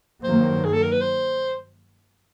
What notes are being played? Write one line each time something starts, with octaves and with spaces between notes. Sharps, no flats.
G2 D#3 F#3 A#3 C5
G#4
A4
A#4
B4
C5